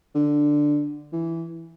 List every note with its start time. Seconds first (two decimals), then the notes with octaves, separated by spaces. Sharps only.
0.15 D3
1.13 E3